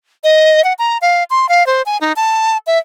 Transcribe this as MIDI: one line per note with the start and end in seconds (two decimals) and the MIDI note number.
0.24 0.64 75
0.64 0.73 78
0.79 0.98 82
1.01 1.24 77
1.30 1.49 84
1.49 1.65 77
1.66 1.82 72
1.86 1.98 80
2.01 2.12 63
2.16 2.57 81
2.67 2.78 76